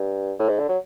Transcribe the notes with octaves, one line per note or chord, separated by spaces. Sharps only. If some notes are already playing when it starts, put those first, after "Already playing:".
Already playing: G2
A2
G#2
D3
F#3